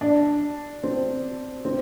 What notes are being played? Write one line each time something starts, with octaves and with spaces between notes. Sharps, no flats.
D4
C4
C4